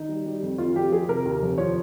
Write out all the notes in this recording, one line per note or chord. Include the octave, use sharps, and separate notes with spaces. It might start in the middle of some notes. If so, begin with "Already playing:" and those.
Already playing: D#3 D#4
G3
G3
F2
F2 F4
F2 G4
F3 G#4
C3 A#4
D#2
F1
F3 C#5